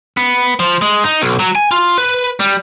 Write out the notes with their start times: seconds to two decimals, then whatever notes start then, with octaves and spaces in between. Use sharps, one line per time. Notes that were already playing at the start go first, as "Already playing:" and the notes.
0.17 B3
0.60 F3
0.82 G#3
1.04 D#4
1.22 B1
1.39 F#3
1.55 G#5
1.72 F4
1.98 B4
2.40 G3